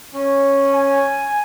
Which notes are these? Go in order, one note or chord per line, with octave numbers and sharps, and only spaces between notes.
C#4
G#5